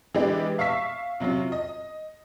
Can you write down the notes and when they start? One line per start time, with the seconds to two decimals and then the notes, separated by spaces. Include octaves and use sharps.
0.14 E3 G#3 D4 G4 B4
0.58 E5 F5 C#6 E6 B6 C7
1.20 C3 F#3 C#4 F4
1.52 D#5